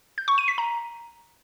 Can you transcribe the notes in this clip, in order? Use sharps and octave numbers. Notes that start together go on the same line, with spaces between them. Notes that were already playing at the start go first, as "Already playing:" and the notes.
G6
C#6
D#7
B6
A#5